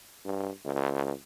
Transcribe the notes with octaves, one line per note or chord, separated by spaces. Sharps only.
G2
C#2